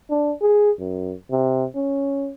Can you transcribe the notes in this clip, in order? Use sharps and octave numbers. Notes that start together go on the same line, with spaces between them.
D4
G#4
F#2
C3
C#4